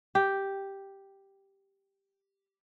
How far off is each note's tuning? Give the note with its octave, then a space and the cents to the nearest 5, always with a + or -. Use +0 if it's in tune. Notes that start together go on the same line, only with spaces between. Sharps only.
G4 +0